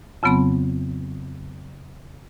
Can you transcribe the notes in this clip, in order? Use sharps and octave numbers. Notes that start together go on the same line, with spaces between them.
F2 C#3 F#3 B3 C4 B5